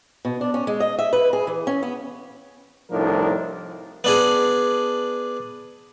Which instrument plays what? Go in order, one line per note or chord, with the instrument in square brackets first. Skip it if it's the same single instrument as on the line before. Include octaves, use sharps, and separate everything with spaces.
[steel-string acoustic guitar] B2
D4
C#4
G#3
D#5
E5
B4
G#4
E3
C#4
B3
[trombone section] C2 A2 F3 D4 D#4 A#4
[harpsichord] B3 D4 G#4